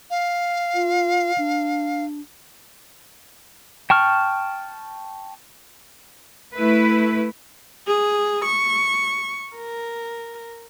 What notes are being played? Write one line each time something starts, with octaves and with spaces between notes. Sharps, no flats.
F5
F4
D4
G5 A5 C#6 F6
A3 E4 B4
G#4
C#6
A#4